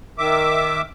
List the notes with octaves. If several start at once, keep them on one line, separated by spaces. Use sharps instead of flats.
D#3 E5 D6